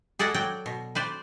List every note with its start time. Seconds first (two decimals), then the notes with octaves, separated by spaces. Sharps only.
0.19 G#4 A4 D5 D#5 F#5
0.34 F#3 D5 G5
0.66 B2
0.95 B4 C5 D5